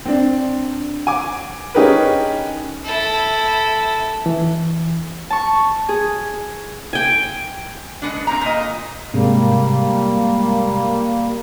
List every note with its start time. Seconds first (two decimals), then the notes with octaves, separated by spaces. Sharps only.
0.05 C4 D4
1.07 G#5 D6
1.74 C#4 D#4 G4 G#4 A#4 B4
2.85 E4 A4
4.26 E3
5.30 A5 C#6
5.89 G#4
6.93 G5 G#5
8.02 G#3 B3 D4
8.27 A#2 C4 A#5
8.41 A#2 D#5
9.14 G#2 C3 G3 G#3 A#3